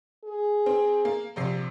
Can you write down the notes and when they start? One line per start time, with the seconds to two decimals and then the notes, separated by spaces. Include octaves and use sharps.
0.24 G#4
0.66 C4
1.05 A#3
1.36 A#1 C3 C7